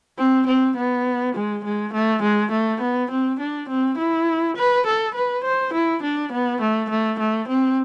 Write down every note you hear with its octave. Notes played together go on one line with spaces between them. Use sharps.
C4
C4
B3
G#3
G#3
A3
G#3
A3
B3
C4
D4
C4
E4
B4
A4
B4
C5
E4
D4
B3
A3
A3
A3
C4